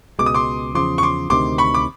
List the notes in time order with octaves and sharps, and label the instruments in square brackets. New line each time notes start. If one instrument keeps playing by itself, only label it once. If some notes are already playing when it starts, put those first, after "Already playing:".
[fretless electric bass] C#2 B2 G#3 [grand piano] D6
[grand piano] D#6
C6 D6
[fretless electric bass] E2 C#3 F3 [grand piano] C6 D6
[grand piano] C#6
C6 D6
[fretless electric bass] D2 C3 D#3 [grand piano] C6 D6
[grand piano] B5 C#6
D6